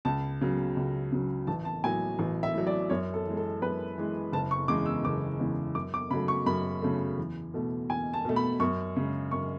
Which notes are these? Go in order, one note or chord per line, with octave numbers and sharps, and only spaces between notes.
C#2 A5
C#3 F#3
C#2
C#3 F#3
A1 A5
A5
A2 F#3 G#5
A1
E5
A2 F#3
D5
F#2 C#5
A4
E3 G#3
A4
F#2 B4
E3 G#3
F#1 A5
C#6
E2 C#3 G#3 D6
E6
F#1 D6
E2 C#3 G#3
F#2 D6
D6
C#3 F#3 A3 B5
C#6
F#2 B5
C#3 F#3 A3
E2
B2 A3
E2 G#5
A5
B2 A3
B5
F#2 C#6
C#3 G#3
F#2 C#6